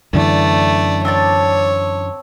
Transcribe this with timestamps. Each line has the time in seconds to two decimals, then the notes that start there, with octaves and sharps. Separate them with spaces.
0.13 F#2 D3 E3 A3 D5
1.05 C4 C#5 D5 A5